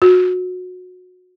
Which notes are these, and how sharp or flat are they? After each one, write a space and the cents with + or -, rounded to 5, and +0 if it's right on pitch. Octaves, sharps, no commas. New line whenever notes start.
F#4 -25